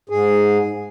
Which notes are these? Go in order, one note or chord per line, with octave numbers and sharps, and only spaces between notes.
G#2 G#4